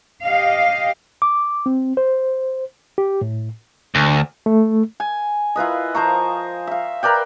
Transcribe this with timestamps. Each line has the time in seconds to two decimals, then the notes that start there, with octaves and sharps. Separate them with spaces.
0.22 G4 D#5 F5
1.22 D6
1.66 C4
1.97 C5
2.98 G4
3.21 A2
3.95 D2
4.46 A3
5.00 G#5
5.56 E4 F4 B4 D#5
5.95 F3 C5 A#5 C#6
6.67 E5 F5
7.03 A#4 B4 D5 G5